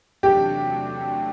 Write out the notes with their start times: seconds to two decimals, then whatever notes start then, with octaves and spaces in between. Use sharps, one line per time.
0.23 E2 C3 F#3 A3 D4 G4